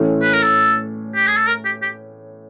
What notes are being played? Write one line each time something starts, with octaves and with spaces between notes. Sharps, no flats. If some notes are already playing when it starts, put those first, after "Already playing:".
Already playing: A2 E3 A3 C#4
B4
A#4
A4
G4
G#4
A4
A#4
G4
G4